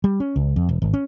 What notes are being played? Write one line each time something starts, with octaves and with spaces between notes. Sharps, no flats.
G3
C#4
C#2
F2
E1
G#1
C#4